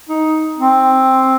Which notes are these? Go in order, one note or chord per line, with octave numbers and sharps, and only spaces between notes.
D#4
C4